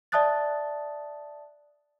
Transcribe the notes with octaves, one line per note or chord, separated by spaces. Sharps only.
D5 E5 A5 D#6 F#6 A6